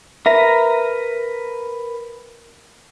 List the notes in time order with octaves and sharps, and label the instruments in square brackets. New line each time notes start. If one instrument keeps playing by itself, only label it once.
[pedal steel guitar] A#4 B4 A#5 [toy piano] E5